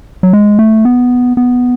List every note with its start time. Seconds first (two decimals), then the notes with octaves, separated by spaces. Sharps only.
0.23 F#3
0.33 G#3
0.59 A3
0.85 B3
1.37 B3